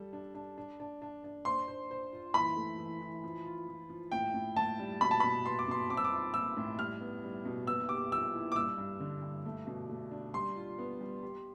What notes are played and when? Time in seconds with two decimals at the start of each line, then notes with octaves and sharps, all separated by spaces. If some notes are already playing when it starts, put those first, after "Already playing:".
Already playing: G3 A4
0.13 D4
0.35 D4
0.58 D4
0.80 D4
1.02 D4
1.24 D4
1.45 C5 C6
1.68 C5
1.91 C5
2.13 F4
2.34 E3 B5
2.57 A3
2.78 E3
3.01 E3
3.24 F3
3.45 F4
3.68 F3
3.89 F3
4.12 A2 G5
4.34 A2
4.56 A2 A5
4.79 G3
5.01 B2 B5
5.11 A5
5.20 B2 B5
5.45 B3 C6
5.59 D6
5.68 B2 C6
5.89 C4 D6
5.97 E6
6.05 D6
6.11 F4
6.34 F3 E6
6.57 A2
6.78 G3 F6
7.01 B3
7.23 G3
7.45 B2
7.67 B3 E6
7.89 G4 D6
8.12 F3 E6
8.34 E4
8.52 D6
8.56 G2 E6
8.78 G2
9.00 D3
9.22 G2
9.45 A3
9.67 B2
9.89 A3
10.11 D4
10.34 G3 C6
10.56 F4
10.79 B3
11.01 G3
11.23 G4